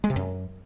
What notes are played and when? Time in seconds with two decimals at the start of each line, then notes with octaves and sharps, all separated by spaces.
0.04 G#3
0.10 C3
0.16 F#2